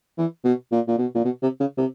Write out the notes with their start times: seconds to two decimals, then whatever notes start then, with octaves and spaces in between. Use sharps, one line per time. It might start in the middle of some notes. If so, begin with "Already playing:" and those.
0.18 E3
0.45 B2
0.72 A#2
0.88 A#2
0.98 B2
1.15 A#2
1.25 B2
1.42 C3
1.60 C#3
1.78 C3